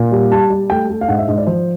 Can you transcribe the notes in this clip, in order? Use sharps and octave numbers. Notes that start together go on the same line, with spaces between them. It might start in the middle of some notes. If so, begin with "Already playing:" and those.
Already playing: A#2
G3
G3 A5
G3
A3 G5
A3
F5
G#2 F#5
E5
G#2 D#5
D5
F3 C5